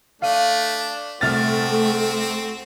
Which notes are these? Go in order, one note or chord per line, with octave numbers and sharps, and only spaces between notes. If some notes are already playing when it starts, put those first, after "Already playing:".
A3 D4 F5 D#7
C2 A3 C4 F#4 F6 A6